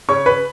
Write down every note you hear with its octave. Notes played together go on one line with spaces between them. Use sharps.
C#3 C#5 C#6
B4 B5